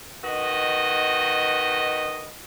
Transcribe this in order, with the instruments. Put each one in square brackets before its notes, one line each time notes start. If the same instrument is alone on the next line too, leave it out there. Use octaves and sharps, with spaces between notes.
[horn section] D#3 F#4 B4 D#5